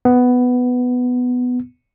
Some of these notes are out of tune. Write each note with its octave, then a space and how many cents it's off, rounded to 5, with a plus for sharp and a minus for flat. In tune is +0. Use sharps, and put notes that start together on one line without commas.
B3 +5